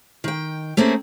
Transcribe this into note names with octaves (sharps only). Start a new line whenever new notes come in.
D#3 G5
A3 A#3 C4 C#4 G#4